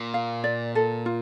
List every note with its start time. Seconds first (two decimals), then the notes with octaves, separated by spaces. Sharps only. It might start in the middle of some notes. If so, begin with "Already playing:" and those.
Already playing: A#2
0.14 F5
0.44 D5
0.75 A4
1.06 F4